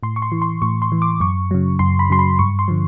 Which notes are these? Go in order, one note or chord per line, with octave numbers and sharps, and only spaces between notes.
A2 C6
C#6
C6
E3
C6
A2 C#6
C6
E3
D6
F#2 C#6
C#3 F#3
F#2 C6
B5
C#3 F#3 C6
B5
G2 C#6
C6
D3 F3